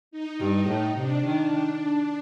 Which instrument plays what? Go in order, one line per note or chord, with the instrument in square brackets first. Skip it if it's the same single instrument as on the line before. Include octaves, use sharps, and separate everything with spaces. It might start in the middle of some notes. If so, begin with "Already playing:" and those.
[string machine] D#4
[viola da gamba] G2
A2
[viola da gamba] C3 [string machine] D4
[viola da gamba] D#3